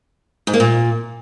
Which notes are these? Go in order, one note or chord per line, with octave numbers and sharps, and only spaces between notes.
G#2
A#3
A#2